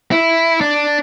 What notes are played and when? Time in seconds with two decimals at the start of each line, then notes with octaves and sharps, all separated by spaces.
0.12 E4
0.61 D4